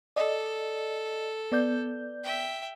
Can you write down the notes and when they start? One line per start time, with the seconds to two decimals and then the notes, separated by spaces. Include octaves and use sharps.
0.16 A4 D5 D#5
1.52 B3 D5 G6
2.23 E5 G5